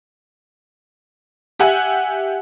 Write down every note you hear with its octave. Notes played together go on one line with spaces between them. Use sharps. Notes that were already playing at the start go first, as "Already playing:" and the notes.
G4 E5 F#5 G#5